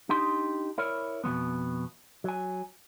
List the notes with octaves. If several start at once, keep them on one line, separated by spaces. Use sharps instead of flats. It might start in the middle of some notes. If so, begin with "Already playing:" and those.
D4 D#4 G4 C6
E4 A#4 C#5 D5
F2 B2 F#3 G#3 B3
F#3 G#5